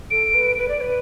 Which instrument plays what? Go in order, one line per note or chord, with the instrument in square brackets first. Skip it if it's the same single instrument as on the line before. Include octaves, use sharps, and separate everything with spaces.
[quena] A4 [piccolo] D7
[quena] B4
B4
D5
B4